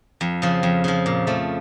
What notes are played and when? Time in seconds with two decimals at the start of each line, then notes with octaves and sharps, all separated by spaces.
0.21 F2
0.42 C#3 F3
0.63 F2
0.84 C#3 F3
1.06 A#2
1.27 F3 A3